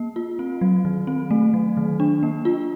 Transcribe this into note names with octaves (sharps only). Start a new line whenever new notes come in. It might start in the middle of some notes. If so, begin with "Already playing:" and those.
Already playing: A#3
F4
C4
F#3
D#3
C4
A3
F#3
D#3
D4
A#3
F4